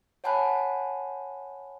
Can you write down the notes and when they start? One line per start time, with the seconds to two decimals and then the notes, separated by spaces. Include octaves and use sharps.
0.24 C#5 F#5 G#5 A5 B5 F#6